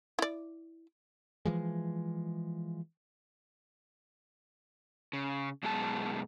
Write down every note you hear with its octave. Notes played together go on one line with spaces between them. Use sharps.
E4 D5
E3 F3 G#3
C#3
F#2 B2 G#3 F#4 A5